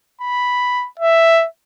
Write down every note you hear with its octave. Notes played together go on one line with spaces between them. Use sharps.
B5
E5